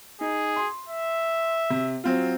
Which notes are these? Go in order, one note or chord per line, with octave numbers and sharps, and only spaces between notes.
D#4 G#4
C6
E5
C3
F#3 C4 F4